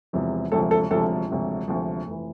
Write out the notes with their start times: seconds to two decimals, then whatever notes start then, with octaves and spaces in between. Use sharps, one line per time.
0.13 E1 E2 C3 F3
0.52 E1 D2 C3 F3 A4
0.71 A4
0.91 E1 D2 C3 F3 A4
1.29 E1 D2 C3 F3
1.68 E1 D2 C3 F3
2.07 F1 E3